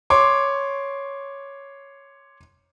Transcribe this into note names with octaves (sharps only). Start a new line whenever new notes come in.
C#5 C6 D6